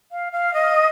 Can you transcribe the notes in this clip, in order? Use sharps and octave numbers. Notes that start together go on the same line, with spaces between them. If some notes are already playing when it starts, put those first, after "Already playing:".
F5
F5
D#5